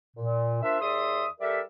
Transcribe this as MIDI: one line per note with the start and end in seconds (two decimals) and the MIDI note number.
0.16 0.60 46
0.63 0.78 58
0.63 0.78 62
0.63 0.78 65
0.63 0.78 72
0.63 0.78 76
0.81 1.26 39
0.81 1.26 68
0.81 1.26 74
0.81 1.26 76
0.81 1.26 84
0.81 1.26 87
1.40 1.61 55
1.40 1.61 67
1.40 1.61 69
1.40 1.61 70
1.40 1.61 74
1.40 1.61 76